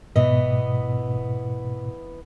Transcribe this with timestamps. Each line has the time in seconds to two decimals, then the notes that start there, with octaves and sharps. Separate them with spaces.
0.16 G#2 B2 E3 B3 D#5